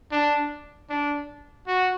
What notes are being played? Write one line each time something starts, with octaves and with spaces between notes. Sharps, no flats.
D4
D4
F#4